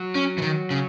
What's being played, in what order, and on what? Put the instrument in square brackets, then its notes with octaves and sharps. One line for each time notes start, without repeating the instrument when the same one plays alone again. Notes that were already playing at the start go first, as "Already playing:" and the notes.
Already playing: [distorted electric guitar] F#3
[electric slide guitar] C#4
E3
D#3
C#3